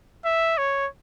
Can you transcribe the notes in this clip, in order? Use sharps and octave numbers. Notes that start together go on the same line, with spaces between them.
E5
C#5